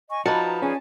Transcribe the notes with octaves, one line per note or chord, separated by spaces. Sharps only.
D#5 G#5 C#6
F3 D#4 F#4 B4 A5 A#5
C#4 G#4 D5 G#5